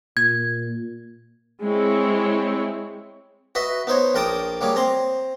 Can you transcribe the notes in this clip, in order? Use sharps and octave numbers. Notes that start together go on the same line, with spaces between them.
A#2 G#6
G#3 C4 E4 C#5
F#4 B4 D#5 E5
B3 D#4 C5 C#5
A#1 A#4 G5 A5 D6 D#6
F#3 G3 A#3 G#4
C4 A#5 C6